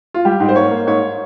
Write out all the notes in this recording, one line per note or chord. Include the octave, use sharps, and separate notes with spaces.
F4
G3 G4
G#2
C5
A#3 C#5
A#3
G#2 C#5